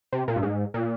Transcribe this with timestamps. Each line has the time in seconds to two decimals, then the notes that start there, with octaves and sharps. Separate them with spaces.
0.12 C3
0.28 A#2
0.36 G2
0.43 G#2
0.74 A#2